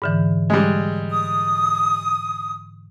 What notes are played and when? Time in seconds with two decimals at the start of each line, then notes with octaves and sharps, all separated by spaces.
0.02 G#2 D3 E3
0.50 G3 G#3
1.10 D#6